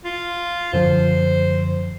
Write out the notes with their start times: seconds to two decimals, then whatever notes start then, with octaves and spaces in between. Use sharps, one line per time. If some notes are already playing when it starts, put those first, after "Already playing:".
0.05 F4
0.73 F#2 D3 F3 C5